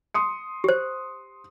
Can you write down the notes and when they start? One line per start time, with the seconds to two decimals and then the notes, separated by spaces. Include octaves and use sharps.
0.14 C6 D#6 C#7
0.64 G4 C5